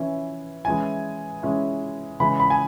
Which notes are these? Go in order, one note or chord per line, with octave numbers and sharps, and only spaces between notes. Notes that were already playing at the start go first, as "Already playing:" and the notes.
Already playing: E3 C#4 E4
E3 G#3 C#4 E4 G#5
E3 G#3 C#4 E4
C#3 E3 G#3 C#4 B5
B5
G#5